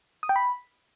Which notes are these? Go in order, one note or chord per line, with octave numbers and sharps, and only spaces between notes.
D#6
G5
B5